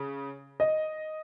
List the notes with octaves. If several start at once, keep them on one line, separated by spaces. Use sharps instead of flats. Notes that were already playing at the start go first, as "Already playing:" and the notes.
Already playing: C#3
D#5